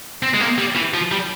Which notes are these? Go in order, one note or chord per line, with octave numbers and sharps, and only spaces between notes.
C4
G#3
A#3
G3
E3
F3
G3